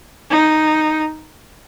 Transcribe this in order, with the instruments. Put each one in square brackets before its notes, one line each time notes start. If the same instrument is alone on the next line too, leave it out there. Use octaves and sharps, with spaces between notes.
[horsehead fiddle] D#4